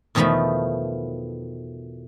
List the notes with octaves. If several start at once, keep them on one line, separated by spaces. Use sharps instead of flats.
E2 B2 D#3 F3 A3 B5